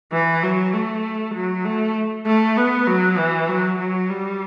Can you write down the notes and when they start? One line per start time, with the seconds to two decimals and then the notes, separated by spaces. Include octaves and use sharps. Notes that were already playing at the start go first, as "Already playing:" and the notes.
0.12 E3
0.43 F#3
0.73 A3
1.35 F#3
1.65 A3
2.26 A3
2.57 B3
2.87 F#3
3.18 E3
3.49 F#3
3.79 F#3
4.10 G3